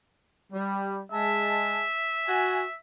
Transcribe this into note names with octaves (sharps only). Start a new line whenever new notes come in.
G3
G#3 E5 A5
F#4 G#5